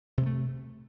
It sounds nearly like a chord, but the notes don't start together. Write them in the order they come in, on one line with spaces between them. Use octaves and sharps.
C3 G#3 A3